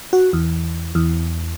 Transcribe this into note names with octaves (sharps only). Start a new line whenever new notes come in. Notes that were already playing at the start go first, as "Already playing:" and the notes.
F#4
E2
E2